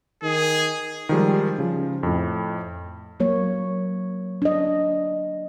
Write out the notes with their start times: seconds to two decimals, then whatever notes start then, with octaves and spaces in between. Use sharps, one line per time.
0.23 D#3 G#4
1.09 D#3 F3 G3 G#3
1.58 C#3 F3
2.03 F2 A2
3.20 F#3 A#3 C#5
4.42 D4 D#5